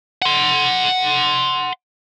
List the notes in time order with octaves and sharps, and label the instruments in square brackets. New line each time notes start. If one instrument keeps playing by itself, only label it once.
[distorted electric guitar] F#5 C6